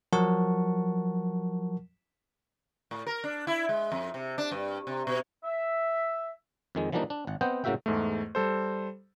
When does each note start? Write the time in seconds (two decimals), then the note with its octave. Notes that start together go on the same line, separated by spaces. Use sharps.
0.13 F3 F#3 A#4 F#5 A5 C#6
2.91 A2
3.07 A#4
3.24 D4
3.47 E4
3.69 G#3
3.92 F2
4.14 C3
4.38 D4
4.51 G2
4.87 C3
5.07 B2
5.44 E5
6.75 F2 D#3 G#3
6.92 E3 F3 G3 A#3 D4 D#4
7.10 D4
7.27 G#1 F#5
7.41 B3 C4 C5 D#5 F#5 G5
7.64 A2 C#3 A#3 F#4 E5 G5
7.86 E2 G#2 A3
8.35 G3 A4 C5